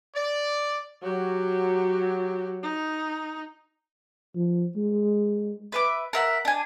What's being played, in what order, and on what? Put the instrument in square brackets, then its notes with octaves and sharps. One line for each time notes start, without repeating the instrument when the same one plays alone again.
[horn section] D5
[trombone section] F#3 [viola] F#4 G4
[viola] D#4
[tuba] F3
G#3
[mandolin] B4 E5 D6
A#4 E5 F#5
D4 G#5